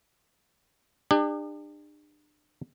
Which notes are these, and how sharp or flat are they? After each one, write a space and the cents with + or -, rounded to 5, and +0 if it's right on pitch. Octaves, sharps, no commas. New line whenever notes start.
D4 +35 G4 +45